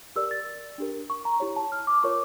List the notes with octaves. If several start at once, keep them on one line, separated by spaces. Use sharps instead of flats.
G4 A#4 D5 E6
A6
D4 G4 A#4
C#6
A#5
E4 G4 C#5
A5
F6
D6
F4 A#4 C#5 C#6